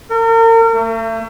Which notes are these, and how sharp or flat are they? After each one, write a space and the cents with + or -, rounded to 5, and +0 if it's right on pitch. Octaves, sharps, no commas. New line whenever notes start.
A#4 -40
A3 +40